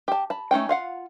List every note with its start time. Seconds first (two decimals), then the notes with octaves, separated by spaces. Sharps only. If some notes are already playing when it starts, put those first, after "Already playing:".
0.08 G4 A5
0.30 A5 B5
0.51 A3 C#4 D#4 G5
0.69 F4 F5 F#5